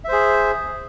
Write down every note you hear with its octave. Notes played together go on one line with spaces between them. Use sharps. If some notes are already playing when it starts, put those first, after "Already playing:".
G#4 C5 E5